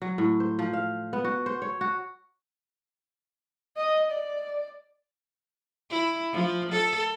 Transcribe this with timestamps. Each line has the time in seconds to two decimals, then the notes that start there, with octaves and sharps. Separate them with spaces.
0.02 F#3
0.18 A2
0.40 C5
0.59 F3
0.73 F5
1.13 B3
1.24 F#4
1.46 C5
1.62 C#5
1.81 F#4
3.77 D#5
4.13 D5
5.90 E4
6.32 F3
6.72 A4